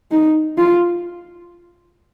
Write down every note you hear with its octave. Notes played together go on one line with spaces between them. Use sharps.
D#4
F4